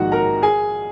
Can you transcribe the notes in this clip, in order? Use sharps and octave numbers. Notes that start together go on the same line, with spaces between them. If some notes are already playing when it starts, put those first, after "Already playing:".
Already playing: A#1 G#2 D#3 F#4 F#5
A#4 A#5
G#4 G#5